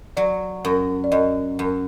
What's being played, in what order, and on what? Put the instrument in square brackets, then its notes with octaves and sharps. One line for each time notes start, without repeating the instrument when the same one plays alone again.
[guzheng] F#3 [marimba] D5
[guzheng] F#2
[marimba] D5
[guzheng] F#2 [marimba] D#5
[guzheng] F#2